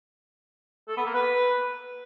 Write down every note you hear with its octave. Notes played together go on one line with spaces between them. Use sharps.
A4
B3
A#3
B4